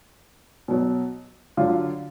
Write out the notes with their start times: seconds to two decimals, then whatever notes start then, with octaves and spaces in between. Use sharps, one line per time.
0.68 B2 F#3
1.57 D3 F#3 F4